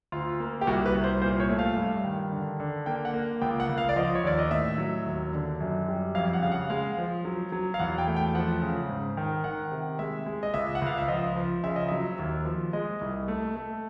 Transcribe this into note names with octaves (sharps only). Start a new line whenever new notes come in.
D2 F4
A#3
G4
C2 F#4
B4
C2
C5
A#2 C5
C#5
A3
F5
G2
D#3
D3
D3
A#3 G5
F#5
A#3
C#2 G5
F#5
C#2
F5
D5
F3 D#5
C#5
D#2 D5
D#5
A2 E5
F#3
D#2
D3
F#2
G3
F2 F5
F#5
C#3 F5
F#5
G#3 F5
F3
F#3
F#3
F5
E2 F#5
G5
A3
G5
F3 F#5
C#3
G#2
D#3
D#3 F#5
C3
G#3 E5
G#3
D#5
C#2 E5
F#5
C#2 F5
E5
F3 D#5
F3
C#3 E5
D#5
F#3 E5
D#2
F3
G#3 D#5
C2
A3
A3